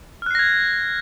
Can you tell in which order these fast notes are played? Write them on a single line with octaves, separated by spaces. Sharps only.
F6 F#6 C7 A#6 G#6